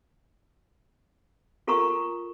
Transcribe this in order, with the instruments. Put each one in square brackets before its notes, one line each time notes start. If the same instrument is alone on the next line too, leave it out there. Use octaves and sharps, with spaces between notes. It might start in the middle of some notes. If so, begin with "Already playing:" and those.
[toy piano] F4 A4 A#4 A#5 C#6 D#6